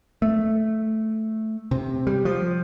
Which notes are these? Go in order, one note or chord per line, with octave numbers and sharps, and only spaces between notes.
A3
C3
G3
F3